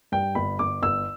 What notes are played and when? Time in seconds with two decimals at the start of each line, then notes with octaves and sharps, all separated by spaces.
0.12 G2 G5
0.35 G1 B5
0.59 G1 D6
0.82 G1 E6